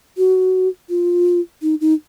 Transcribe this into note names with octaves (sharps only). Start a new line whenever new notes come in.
F#4
F4
D#4
D#4